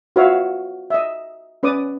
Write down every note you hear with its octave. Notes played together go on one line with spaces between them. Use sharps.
F4 F#4 B4 C#5 E5 F5
D#5 E5
C#4 B4 D5 D6 D#6